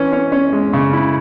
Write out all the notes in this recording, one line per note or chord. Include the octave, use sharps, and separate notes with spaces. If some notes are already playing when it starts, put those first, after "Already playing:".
Already playing: E3 C#4
C#4
C#4
G#3
C#3
E4